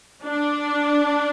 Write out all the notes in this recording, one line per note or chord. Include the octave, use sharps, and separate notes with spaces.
D4